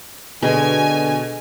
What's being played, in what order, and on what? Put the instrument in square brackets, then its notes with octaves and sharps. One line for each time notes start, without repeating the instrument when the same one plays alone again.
[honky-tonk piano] B2 [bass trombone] D3 [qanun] G#3 [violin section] G#5